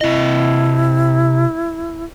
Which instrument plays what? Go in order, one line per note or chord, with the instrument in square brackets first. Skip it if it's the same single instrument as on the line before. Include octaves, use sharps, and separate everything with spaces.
[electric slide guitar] C3 D#5 [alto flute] E4